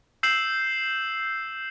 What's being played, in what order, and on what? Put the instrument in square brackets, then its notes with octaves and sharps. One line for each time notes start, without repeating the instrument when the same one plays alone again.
[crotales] E6 G6 C7 E7 F#7